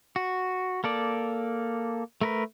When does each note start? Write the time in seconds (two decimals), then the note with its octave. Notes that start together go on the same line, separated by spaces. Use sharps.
0.16 F#4
0.84 A#3 A4 D5
2.21 A3 A#4 B4